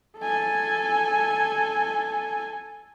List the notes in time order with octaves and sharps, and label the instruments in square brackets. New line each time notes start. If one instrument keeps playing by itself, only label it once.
[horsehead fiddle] A4 G#5